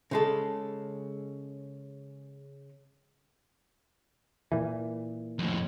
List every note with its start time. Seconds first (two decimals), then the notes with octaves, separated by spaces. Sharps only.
0.11 C#3 G#3 A4
4.52 A#2 E3
5.39 F2 A2